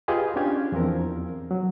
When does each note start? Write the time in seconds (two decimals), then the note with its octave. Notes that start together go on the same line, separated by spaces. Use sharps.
0.08 F4 G4 G#4 B4 D#5
0.36 C#4 D4 F4 G4 G#6
0.72 E2 F3 C4 A#4
1.51 F#3